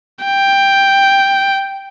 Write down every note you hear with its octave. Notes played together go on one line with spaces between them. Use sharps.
G5